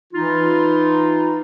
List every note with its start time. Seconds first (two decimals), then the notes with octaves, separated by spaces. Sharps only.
0.13 E3 D#4 F4